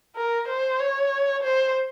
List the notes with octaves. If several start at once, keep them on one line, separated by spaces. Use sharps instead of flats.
A#4
C5
C#5
C5